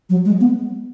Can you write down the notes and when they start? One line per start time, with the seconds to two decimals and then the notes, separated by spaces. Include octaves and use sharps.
0.10 F#3
0.25 G#3
0.40 B3